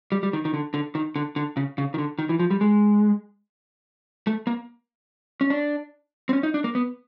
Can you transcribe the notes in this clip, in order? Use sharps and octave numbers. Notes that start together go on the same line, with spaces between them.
G3
G3
D#3
D#3
D3
D3
D#3
D3
D3
C#3
C#3
D#3
D3
D#3
E3
F3
G3
G#3
A3
A#3
C#4
D4
C4
C#4
D#4
D4
A#3
B3